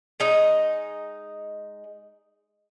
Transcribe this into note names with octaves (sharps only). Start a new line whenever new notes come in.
G#3 D#4 D#5